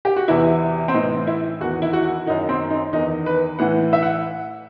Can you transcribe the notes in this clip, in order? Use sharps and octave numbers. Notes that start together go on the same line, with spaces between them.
G4
F#4
E2 C3 E3 E4
C4
A2 E3 D#4
E4
E2 D#3 F#4
E4
F#4
F#2 D#3 D#4
C4
D#4
E2 D#3 D#4
B4
A2 E3 F#5
E5
F#5